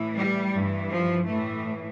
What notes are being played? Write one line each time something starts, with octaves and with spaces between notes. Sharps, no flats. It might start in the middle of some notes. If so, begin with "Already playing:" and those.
Already playing: A2 E3
G3
G2 E3
F3
A2 E3 A3